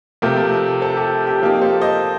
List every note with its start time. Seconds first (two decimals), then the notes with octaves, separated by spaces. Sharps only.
0.22 C3 F3 A3 G4 A#4
0.81 A4 C5
0.97 G4
1.27 G4
1.42 F3 A#3 D#4 G4
1.61 A4 C5
1.81 C5 D#5